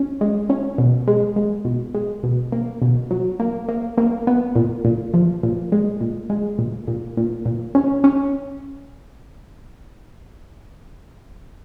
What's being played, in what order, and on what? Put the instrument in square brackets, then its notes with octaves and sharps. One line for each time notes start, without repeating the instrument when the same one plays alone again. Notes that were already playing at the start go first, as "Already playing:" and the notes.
Already playing: [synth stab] C#4
G#3
C#4
B2
G#3
G#3
B2
G#3
B2
A#3
B2
F#3
A#3
A#3
A#3
B3
A#2
A#2
F3
A#2
G#3
A#2
G#3
A#2
A#2
A#2
A#2
C#4
C#4